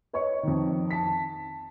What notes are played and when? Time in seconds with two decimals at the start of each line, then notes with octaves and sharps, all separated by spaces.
0.13 B4 C#5 D#5 C#6
0.43 F2 D#3
0.91 A5 B6